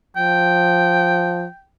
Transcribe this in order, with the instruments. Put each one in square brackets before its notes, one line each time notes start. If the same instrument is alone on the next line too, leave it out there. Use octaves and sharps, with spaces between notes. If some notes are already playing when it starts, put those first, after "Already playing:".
[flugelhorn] F3 [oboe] G5